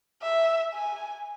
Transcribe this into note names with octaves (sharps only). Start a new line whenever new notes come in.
E5
G#5